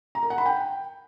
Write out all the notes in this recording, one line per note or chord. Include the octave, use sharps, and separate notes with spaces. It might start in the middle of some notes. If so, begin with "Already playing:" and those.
A#5
A#4
F#5
B5
G5